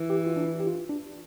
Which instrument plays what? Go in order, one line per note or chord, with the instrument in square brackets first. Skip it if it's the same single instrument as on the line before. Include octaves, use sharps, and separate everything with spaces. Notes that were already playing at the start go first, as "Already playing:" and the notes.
Already playing: [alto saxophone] E3
[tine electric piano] G4
F4
D4
E4
G4
F4
D4